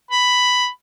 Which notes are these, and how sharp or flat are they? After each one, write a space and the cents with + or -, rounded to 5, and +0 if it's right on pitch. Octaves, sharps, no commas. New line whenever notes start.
B5 +5